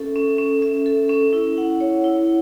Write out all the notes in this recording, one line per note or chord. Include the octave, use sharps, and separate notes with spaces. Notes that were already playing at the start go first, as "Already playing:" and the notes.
Already playing: C#4 A4 E5
C#4
C#4
E5
A4
C#4
E4
F#5
C#5
E4